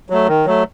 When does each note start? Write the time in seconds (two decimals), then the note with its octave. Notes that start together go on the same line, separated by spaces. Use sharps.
0.10 F#3 A3
0.28 D#3
0.46 F#3 A3